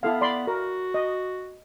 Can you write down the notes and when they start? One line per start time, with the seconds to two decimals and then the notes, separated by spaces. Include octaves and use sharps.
0.03 B3 E4 A4 F5
0.21 D5 B5 C6
0.47 F#4 A#4
0.94 D#5